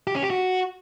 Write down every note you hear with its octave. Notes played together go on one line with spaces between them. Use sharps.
G4
C#4
G4
F#4